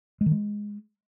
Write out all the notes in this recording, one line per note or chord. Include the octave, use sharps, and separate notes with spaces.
G#3
D#3
G#3